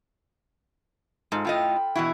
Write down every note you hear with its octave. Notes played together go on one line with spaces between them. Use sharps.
G#2 F4 A4
A2 F4 D#5 G5
B5
B2 E3 E4 F#4